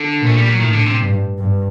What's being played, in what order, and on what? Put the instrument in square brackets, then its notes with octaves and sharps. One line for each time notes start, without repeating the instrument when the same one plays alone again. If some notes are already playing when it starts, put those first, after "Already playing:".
Already playing: [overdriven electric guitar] D3
[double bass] A#2
[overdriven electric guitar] A3
G3
F#3
[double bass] A2 [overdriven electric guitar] D#3
[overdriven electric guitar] D3
C3
[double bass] G2
G2